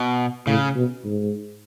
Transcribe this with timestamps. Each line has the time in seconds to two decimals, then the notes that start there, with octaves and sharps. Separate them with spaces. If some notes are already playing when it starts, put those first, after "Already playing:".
Already playing: B2
0.47 A2 C#3
0.76 B2
1.05 G#2